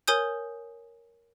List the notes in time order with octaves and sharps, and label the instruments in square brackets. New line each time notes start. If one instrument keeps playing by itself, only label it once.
[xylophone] A#4 C#5 G#5 D#6 G6